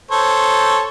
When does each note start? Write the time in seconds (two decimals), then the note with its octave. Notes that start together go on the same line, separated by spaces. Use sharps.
0.11 A4 C5 C#5